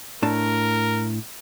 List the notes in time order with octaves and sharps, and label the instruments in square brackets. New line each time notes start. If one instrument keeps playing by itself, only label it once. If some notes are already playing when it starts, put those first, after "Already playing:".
[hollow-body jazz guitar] A2 D4 A5 [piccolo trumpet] A#4